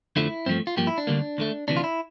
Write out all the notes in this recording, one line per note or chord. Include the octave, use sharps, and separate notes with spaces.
F2 D3 F3 A3 E4
G2 F3 A3 C4
F4
G2 F3 A#3 G4
E4
D4
D2 D3 G3 A#3
D2 D3 A3
D2 C3 E3 D4
F4
E4